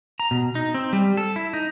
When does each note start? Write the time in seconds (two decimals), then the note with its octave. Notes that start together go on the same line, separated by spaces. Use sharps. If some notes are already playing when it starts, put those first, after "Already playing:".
0.20 A#5
0.31 B2
0.55 D#4
0.74 C4
0.93 G3
1.17 A4
1.36 E4
1.53 D#4